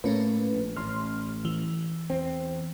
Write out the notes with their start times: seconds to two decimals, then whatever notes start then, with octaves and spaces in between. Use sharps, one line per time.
0.04 A2 A3 A#3 C#4 B4
0.54 A#1
0.76 A1 C#4 C6 F6
1.45 E3
2.10 E2 C4